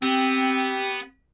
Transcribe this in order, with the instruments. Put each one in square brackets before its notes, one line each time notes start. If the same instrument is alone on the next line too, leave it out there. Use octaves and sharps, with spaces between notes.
[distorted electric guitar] B3 [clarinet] C4 [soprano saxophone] G4